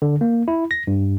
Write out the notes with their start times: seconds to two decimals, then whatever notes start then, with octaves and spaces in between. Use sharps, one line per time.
0.02 D3
0.21 A#3
0.48 E4
0.71 A#6
0.87 G2